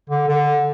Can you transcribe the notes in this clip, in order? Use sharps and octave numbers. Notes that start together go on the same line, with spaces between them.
D3
D3